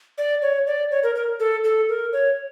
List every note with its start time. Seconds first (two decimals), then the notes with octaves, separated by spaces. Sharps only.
0.18 D5
0.42 C#5
0.67 D5
0.91 C#5
1.03 A#4
1.15 A#4
1.40 A4
1.64 A4
1.89 A#4
2.13 C#5